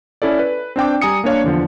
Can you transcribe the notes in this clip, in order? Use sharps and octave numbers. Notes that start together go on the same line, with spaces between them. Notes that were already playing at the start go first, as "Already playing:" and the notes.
C#4 E4 A4 D5
B4
C4 D4 G5 D6
G3 G#5 A#5 D#6 C#7
A#3 D4 C#5 F5
E2 D3 F3